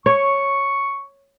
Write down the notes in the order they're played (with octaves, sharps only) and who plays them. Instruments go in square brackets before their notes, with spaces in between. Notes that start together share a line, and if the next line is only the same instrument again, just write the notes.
[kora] C#5 [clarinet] C#6